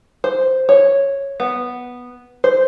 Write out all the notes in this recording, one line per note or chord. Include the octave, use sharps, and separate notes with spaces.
C5
C#5
B3
C5